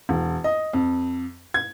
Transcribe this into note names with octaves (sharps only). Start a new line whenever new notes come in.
E1
D#5
F2
G#6